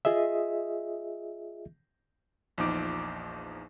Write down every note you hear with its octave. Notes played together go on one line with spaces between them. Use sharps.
F4 G#4 D#5 E5
A#1 E2 F3 D#4 D6